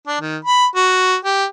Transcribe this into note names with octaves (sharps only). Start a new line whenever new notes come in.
D4
D#3
B5
F#4
G4